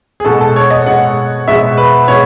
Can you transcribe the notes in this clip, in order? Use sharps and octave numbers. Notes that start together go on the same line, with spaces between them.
G#4
B2 G#3 A4
A4
C#5
D#5
B2 G#3 F#5
B2 G#3 E5
B4
B2 G#3 C#5